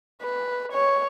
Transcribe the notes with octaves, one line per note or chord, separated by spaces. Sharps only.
B4
C#5